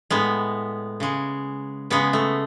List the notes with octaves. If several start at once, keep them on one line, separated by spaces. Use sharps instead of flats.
A2 G#3 B3
C#3 G#3
C#3 G#3 B3
A3